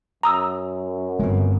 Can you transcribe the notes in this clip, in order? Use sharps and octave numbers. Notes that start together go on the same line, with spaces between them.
F#2 A#5 D#6 E6
G1 G2 G#3 C4